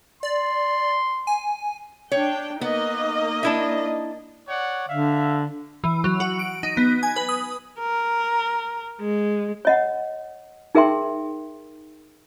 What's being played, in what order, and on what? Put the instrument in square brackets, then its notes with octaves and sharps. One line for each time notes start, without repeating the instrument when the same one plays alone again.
[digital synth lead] D5 [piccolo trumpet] C6
[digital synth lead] G#5
[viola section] D4 G5 [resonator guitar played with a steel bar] C#5
[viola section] A#3 D#4 D#5 [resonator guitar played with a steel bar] B3
[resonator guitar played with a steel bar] D4 E4 E5
[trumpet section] C#5 D5 F#5
[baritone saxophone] D3 [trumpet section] E5 F5
[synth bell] E3
F#3
F#4
D7
D#4
B3
G#5
B4
D#6
[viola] A#4
G#3
[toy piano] C#5 D#5 F#5
D#4 G#4 A#4 E5 G5 C6